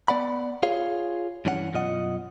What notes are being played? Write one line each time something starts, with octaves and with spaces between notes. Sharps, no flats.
B3 D5 F#5 B5
F4 G#4 C#5 F5
G2 E3 C#4 G4 F#5
F#2 B2 F4 D#5 F#5